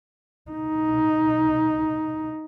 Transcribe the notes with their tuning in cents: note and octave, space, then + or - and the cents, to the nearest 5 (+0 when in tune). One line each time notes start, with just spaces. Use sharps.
D#4 +5